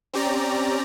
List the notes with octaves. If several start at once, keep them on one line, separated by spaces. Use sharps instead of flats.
C4 C#4 G4 D5 A#5